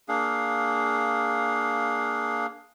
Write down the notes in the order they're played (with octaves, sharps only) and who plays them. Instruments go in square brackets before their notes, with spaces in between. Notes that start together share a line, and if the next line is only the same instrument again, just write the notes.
[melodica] A#3 D4 G#4 F5